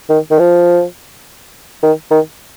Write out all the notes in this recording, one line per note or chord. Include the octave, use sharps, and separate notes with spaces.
D#3
D#3
F3
D#3
D#3